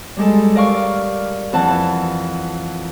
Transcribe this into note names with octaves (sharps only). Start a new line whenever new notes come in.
G3 G#3 A4
A#4 D5 F5 C#6 F6
F2 E3 F#5 A5